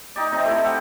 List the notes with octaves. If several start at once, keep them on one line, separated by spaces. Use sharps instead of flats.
D#4 G4 D5
C3 C4 D#5
A3 E4
G4 F#5